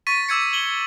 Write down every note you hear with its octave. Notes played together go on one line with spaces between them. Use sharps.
C#6 A6 B6 D#7
D6 E6 G#6 C#7
F#7 G7